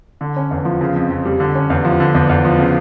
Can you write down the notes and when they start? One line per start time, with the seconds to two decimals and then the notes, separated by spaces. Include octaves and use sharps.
0.21 D3
0.36 C#4
0.51 E2
0.65 F3
0.81 C#3
0.96 F2
1.10 F2
1.25 G3
1.40 D3
1.55 C#4
1.70 E2
1.85 F3
2.00 D3
2.14 E2
2.29 E2
2.45 F3
2.59 C#3